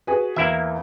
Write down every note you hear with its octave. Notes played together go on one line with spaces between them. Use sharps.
F#4 G#4 B4
E2 A#3 E4 E5